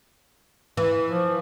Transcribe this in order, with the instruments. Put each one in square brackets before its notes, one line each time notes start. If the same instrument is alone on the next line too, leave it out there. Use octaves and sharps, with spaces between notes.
[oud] E3
[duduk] F3